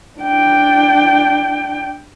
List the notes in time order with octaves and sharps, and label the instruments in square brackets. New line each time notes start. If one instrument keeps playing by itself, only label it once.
[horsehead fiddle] D4 G5